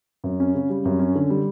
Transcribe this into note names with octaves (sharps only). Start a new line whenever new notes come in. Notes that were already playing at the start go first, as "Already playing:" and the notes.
F#2
C#4
C#3
G3
F#2
C#4
D3
G3